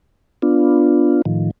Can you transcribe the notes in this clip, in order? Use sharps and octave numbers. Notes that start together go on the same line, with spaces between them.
B3 D4 F4
A2 D#3 F3